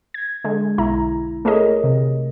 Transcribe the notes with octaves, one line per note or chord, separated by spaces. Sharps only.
G#6
D3 G#3
B1 E4 A#5
A3 G#4 A#4 C#5 D#5
C3